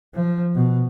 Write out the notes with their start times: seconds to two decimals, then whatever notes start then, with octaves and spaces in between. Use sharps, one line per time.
0.15 F3
0.55 B2